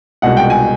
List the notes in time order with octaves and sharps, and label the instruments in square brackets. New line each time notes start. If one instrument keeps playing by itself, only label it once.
[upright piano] C2 B2 G#3 F#5
G5
G#5